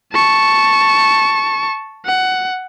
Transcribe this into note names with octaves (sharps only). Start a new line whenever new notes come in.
A5 C#6
F#5